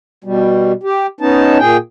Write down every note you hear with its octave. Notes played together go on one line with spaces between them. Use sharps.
B2 G3
G4
B3 C#4 D#4 A5
A#2 G#4 G5